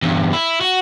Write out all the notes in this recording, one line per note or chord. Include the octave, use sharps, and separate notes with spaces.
E2 G2
E4
F#4